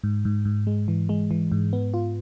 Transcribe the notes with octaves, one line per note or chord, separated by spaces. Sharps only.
G#2
G#2
G#2
G#3
E3
G#3
E3
G#2
B3
F4